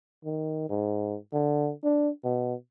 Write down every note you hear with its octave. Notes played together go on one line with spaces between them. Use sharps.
D#3
G#2
D3
D4
B2